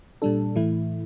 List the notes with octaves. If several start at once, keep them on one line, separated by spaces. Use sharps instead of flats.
A#2 G3 D4 A4
A2 E3 A3 E4